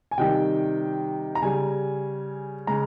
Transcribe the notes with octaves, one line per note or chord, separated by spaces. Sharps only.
G#5
C3 D#3 G3 G5
A#5
C#3 G3 G#5
C#3 G#3 A#5